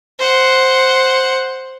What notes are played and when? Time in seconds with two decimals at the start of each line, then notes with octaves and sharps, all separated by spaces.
0.19 C5 F#5